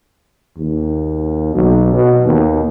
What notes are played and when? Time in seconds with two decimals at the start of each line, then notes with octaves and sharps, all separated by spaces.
0.58 D#2
1.55 B1
1.94 B2
2.25 D#2